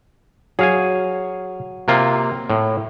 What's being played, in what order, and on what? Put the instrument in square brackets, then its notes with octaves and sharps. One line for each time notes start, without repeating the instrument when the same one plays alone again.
[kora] F#3 [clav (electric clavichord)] G#4 F5 G#5
[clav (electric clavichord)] C3 A#3 F4
A2